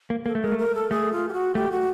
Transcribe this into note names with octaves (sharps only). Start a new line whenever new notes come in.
A#3
A#3 A4
A3
G#3 A#4
A3
A#4
A4
A3 G#4
F4
G4
F#4
A3 G4
F#4